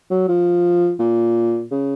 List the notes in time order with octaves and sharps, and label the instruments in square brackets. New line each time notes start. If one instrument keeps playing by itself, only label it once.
[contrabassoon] F#3
F3
A#2
C#3